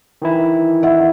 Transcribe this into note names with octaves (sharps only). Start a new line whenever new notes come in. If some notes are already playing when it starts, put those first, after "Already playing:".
D#3 E3 E4
E5 F#5